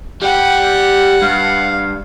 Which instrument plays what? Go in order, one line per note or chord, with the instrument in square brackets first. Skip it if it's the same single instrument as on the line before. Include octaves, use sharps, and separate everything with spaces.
[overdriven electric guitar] G3 G5 [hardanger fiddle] F#5
[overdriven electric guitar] G2 [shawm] F5